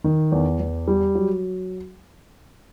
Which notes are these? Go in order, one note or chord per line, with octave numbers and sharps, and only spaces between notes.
D#3
E2
E2
G3
F#3